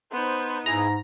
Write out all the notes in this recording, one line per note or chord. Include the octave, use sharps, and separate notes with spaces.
B3 D#4 C5
G#2 E4 G#4 A#5